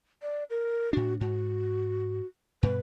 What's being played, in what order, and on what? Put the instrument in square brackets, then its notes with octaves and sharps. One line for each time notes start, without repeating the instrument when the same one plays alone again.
[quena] D5
A#4
[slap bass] A2 D4 [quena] F#4
[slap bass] G#2 [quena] F#4
[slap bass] G2 B2 [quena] B4